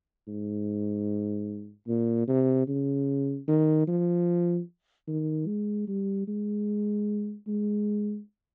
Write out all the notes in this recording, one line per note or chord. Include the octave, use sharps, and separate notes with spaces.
G#2
A#2
C3
C#3
D#3
F3
D#3
G#3
G3
G#3
G#3